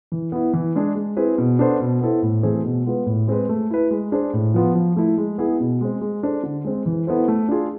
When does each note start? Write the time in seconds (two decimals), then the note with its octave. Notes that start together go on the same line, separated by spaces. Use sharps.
0.12 E3
0.32 B3 E4
0.53 E3
0.75 G#3 D4 G#4
0.95 G#3
1.17 C4 E4 G#4 B4
1.38 B2
1.59 B3 D4 A4 C5
1.80 B2
2.01 B3 E4 A4 C5
2.22 A2
2.43 E3 A3 C4 G#4
2.65 B2
2.85 G#3 B3 F4 B4
3.06 A2
3.28 G#3 C4 G#4 B4
3.49 A3
3.70 E4 B4
3.91 G#3
4.12 D4 G#4 C5
4.33 A2
4.54 F3 B3 F4
4.75 F3
4.96 A3 E4
5.18 G#3
5.38 B3 E4 G#4
5.60 B2
5.81 G#3 C4
6.01 G#3
6.23 D4 A4 C5
6.43 D3
6.64 G#3 C4
6.86 E3
7.07 B3 E4 A4 C5
7.28 A3
7.49 D4 F4 G#4